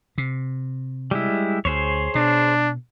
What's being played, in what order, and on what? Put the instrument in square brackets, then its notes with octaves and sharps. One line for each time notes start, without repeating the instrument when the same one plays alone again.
[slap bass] C3
[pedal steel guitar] G3 G#3 E4
[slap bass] D2 [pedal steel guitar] G#4 C5 C#5
[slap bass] B2 [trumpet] D4